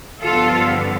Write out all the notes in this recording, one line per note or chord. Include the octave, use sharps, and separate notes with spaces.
G2 D3 F3 B3 F4 A4